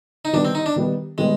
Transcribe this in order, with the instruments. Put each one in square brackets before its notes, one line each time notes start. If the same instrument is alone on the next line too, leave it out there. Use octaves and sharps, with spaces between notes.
[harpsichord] D#4
[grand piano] D#3 G3 B3 [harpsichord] D4
[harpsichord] C4
D#4
D4
[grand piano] D#3 G3 B3
[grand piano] D#3 G3 B3 [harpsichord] G#3